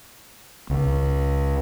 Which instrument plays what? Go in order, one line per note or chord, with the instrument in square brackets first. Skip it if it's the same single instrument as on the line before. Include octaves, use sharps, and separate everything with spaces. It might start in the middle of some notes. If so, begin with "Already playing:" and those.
[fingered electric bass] C#2